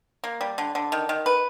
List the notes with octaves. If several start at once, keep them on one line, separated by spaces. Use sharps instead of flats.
A#3
G3
D3
D3
D#3
D#3
B4